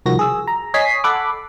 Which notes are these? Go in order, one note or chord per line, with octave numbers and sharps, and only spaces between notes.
C2 D#3 F3 F#4 A#6
G#4 E6
A#5
C#5 D#5 G#5 B6 C7
A4 F#5 B5 D6